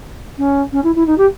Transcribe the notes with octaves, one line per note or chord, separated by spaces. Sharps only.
C#4
C#4
E4
E4
D#4
G4